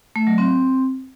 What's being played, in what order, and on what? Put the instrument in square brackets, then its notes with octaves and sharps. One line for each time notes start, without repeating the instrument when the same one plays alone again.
[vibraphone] A3
F#3
C4